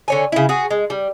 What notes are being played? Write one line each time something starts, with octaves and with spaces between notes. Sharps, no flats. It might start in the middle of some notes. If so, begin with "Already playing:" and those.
D3 C#5 G#5
C#3 E4
F#4 G#4
G#3
G3